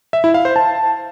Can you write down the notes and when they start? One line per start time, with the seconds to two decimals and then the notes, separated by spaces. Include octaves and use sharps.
0.13 E5
0.24 E4
0.34 F5
0.45 C5
0.56 A5